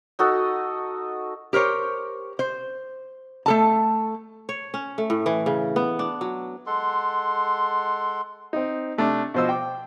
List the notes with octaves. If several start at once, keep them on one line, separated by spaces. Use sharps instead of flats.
D#4 F#4 A4 D#5
G4 A#4 C5 C#5
C5
A3 A4 A5
C#5
C#4
A3
A2
E3
C#3
B3
D4
F#3
G#3 A4 F#5 C6
C4 D#4
C3 A3 D4
B2 F3 C5 D#5 E6
G5 D6